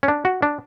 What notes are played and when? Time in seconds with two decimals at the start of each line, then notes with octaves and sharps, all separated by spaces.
0.03 C#4
0.08 D4
0.25 F#4
0.42 D4